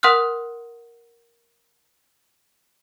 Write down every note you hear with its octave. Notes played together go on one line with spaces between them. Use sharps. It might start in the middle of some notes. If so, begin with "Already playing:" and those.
A#4 F#5 C6 D#6 F6 F#6